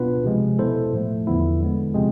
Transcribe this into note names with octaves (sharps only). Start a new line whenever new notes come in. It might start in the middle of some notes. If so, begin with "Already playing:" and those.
Already playing: B2 B3 D4 F4 B4
C3 F3 G#3
B2 B3 E4 A4 C5
A2 F3 A3
E2 D3 F3 B3 E4
D3 G#3 B3
C3 F3 G#3 C4